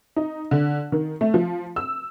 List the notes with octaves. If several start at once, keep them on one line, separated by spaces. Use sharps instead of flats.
D#4
D3
D#3
A3
F3
E6